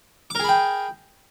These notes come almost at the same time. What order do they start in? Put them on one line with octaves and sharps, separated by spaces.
D6 A#4 G#4 B5 G5